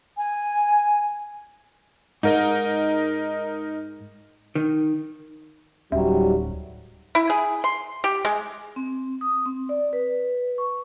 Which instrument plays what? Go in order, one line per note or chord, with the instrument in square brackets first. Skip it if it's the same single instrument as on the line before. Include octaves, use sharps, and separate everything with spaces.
[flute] G#5
[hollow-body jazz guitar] G#2 [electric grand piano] D#4 A#4 D#5
[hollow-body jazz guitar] D#3
[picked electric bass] D1 C#4 [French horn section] G#2 F#3 G3 [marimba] E5
[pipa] E4
G#4
C6
G4
G#3
[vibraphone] C4
D#6
C4
D5
B4
C#6